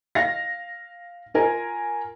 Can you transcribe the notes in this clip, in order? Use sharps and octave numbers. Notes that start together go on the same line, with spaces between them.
F5 A#6
F4 A#4 G#5